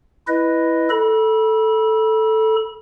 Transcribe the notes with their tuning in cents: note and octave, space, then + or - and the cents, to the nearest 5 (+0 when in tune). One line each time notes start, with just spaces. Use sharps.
E4 +0 B4 +0 D#5 +0
A4 +0 B5 -35